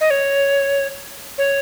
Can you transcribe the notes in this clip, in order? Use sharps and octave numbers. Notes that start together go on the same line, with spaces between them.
D#5
C#5
C#5